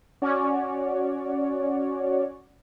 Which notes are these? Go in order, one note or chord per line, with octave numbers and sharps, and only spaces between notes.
C#4 F#4 C#5 D5